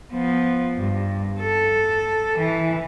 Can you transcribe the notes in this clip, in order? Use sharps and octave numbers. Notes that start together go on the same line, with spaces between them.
F3 B3
G2
A4
E3